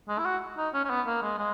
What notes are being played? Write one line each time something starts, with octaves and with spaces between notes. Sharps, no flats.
G#3
E4
F#4
D#4
C#4
C#4
B3
A#3
G#3
G#3